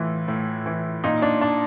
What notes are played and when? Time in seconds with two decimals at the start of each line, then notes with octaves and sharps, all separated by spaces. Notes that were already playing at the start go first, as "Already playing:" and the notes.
Already playing: A2 E3 F4
0.28 A2
0.66 E3
1.04 A#2 D#4
1.22 D4
1.41 D4